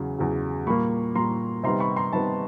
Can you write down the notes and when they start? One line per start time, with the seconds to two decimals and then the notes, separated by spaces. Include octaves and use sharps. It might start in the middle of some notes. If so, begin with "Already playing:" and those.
Already playing: E2 C#3 F#3
0.18 E2 C#3 F#3
0.67 A#2 G3 A#3 B5 C#6
1.15 A#2 G3 A#3 A#5 C6
1.63 C3 D#3 G3 B3 A#5 C6
1.80 B5 C#6
1.96 A#5 C6
2.13 C3 D#3 G3 B3 A5 B5